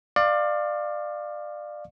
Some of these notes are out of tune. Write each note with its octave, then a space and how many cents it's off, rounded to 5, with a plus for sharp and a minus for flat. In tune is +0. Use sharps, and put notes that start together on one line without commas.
D5 +25 F5 +0 C#6 -35